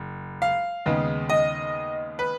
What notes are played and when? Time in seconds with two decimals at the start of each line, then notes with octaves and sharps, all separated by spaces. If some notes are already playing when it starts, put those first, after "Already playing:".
Already playing: F#1
0.42 F5
0.86 D#2 C#3 G#3 B3 D#4
1.30 D#5
2.19 B4